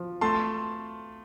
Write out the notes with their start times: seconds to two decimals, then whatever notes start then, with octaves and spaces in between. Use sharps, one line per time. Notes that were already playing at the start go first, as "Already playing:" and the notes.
Already playing: F3
0.21 A3 A5 C6